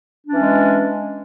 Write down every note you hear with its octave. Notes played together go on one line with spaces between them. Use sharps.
E3 G#3 C#4 D4